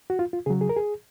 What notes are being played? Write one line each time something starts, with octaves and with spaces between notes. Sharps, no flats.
F#4
F4
F4
C#3 F#3 G#4
G#4
A#4
G#4